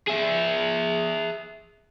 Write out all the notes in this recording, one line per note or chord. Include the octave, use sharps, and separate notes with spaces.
G#4 E5